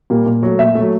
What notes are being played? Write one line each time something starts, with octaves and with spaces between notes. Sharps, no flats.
A#2 G3 A#3
A#2
F#3 A3
A#2 E5
F#3 A3